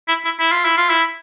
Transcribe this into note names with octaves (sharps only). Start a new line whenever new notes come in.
E4
E4
E4
F4
E4
F4
E4